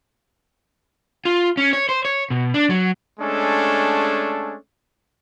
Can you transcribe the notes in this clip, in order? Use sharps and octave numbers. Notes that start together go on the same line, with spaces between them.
F4
C#4
C#5
C5
C#5
B2
D4
F#3
G#3 A3 C#4 D4 A4